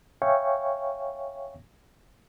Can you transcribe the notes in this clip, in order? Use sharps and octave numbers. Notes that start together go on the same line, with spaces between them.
C#5 E5 F5 G5 G#5 C#6